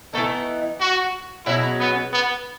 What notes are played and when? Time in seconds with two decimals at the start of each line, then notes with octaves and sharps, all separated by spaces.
0.13 E3 A3 B3 D#4 A4
0.79 F#4
1.46 B2 F#3 C#4 E4 G#4
1.79 B3
2.13 B3